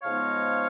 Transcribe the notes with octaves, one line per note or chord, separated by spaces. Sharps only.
G#2 F3 G#3 B3 D#4 C#5 F5